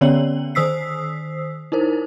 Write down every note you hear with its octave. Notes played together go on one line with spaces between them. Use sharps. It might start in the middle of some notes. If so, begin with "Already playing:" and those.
D3 B3 C#4 C#5 D5 F#7
D#3 C5 D#6 E6 B6 C7
D#4 E4 A#4 C5